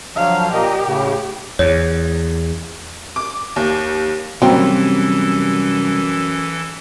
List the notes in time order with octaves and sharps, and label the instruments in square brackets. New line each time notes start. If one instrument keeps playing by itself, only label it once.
[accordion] D3 F3 F#3 [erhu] F5
[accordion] A#2 A#3 D#5 [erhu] G4
[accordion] A2 C#3
[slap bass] E2 [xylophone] C#5
[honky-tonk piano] D6
D#2
[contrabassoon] F#2 [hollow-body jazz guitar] C3 G3 [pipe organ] E3 A4 [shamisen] F#3 A#3 C4